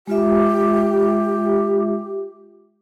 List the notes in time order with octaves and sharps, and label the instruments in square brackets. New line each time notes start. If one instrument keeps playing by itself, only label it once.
[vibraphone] G#3 F4 E5 [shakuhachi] G4